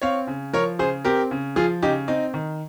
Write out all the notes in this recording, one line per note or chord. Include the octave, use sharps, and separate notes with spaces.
C4 C#5 F5
C#3
F3 A#4 C#5
C#3 G#4 C5
C4 G4 A#4
C#3
F3 F4 G#4
C#3 D#4 G4
C4 D#4
D#3